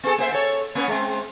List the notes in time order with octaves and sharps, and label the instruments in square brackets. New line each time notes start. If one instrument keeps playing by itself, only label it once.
[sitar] B3 G#4 A4
A#3 C5 E5
A4 C#5
A#3 B3 C#4
G#3 C4